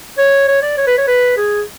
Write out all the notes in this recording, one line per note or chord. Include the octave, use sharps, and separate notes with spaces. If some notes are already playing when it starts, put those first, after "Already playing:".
C#5
C#5
D5
C#5
B4
C#5
B4
G#4